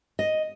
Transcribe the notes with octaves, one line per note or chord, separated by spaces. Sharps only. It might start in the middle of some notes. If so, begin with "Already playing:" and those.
D#5